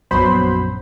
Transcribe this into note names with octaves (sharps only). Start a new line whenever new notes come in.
A#1 F#2 F#3 B3 C5 B5